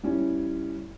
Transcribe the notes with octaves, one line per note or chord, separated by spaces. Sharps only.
G3 C#4 E4